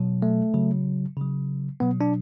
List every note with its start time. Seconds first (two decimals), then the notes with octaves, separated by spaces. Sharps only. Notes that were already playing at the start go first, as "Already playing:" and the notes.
Already playing: B2 F#3
0.22 A3
0.54 C#3 F#3
1.17 C#3 F#3
1.80 B2 F#3 B3
2.01 D4